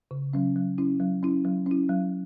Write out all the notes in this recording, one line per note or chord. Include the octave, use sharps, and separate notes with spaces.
C#3
F#3 C#4
F#3
C#4 E4
F#3
C#4 E4
F#3
C#4 E4
F#3